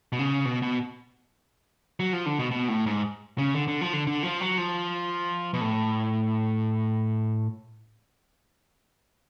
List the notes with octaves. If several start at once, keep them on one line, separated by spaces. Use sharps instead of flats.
B2
C#3
B2
B2
F#3
F3
D3
B2
B2
A2
G#2
C#3
D3
D3
F3
D3
D3
F3
F#3
F3
B2
A2